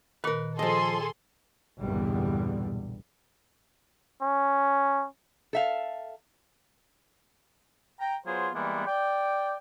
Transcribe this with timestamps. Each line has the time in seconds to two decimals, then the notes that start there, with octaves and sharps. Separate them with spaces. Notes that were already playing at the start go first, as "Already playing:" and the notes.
0.24 A#2 D#3 A#4 B4
0.59 F3 G#4 A4 D#5 C6
1.81 B1 E2 G2 A#2 D3 G3
4.22 C#4
5.53 A4 E5 F5
7.99 G5 A#5
8.26 F#3 B3 F4 G#4 C5
8.54 E3 G3 G#3 A#3 B3
8.86 D5 G5